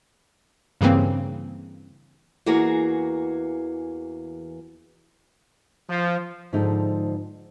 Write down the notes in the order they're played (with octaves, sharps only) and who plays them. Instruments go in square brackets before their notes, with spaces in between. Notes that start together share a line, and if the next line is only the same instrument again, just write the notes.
[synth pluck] G2 C#3 E3 A#3 C4
[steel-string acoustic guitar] E2 E3 A#3 F#4 G#4 A#5
[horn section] F3
[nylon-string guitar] G#2 D3 F3 G#3 D#4